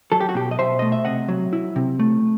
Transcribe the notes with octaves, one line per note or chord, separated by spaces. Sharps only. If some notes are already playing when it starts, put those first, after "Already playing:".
F#3 A4
G4
F#4
B2 G4
D#5
B2 C5 E5
A3 D#5
E5
C3 D#5 F#5
F#3
E4
C3
A3